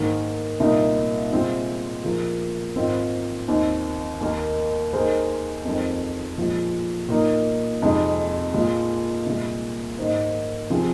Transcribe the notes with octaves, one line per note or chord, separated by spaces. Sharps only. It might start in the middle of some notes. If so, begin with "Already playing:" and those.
Already playing: G#2 D#3 A#3
C2 A#2 A#3 D#4
C2 A#2 G#3 C4 F4
A#2 F3 A#3 G#4
G#2 D#3 C4 F4
D#2 D#3 C4
D#2 D#3 A#3
D#2 D#3 A#3 G#4 C5
F2 D#3 G#3 C4
A#2 F3 G#3
A#2 A#3 D#4
F2 C3 G#3 D#4
A#2 G#3 F4
C2 A#2 G#3
G#2 D#3 A#3 D#4 C5
C3 F3 C4 G#4